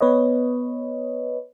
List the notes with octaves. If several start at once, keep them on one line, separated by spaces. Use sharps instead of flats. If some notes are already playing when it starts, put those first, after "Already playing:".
B3 B4 C#5 D#5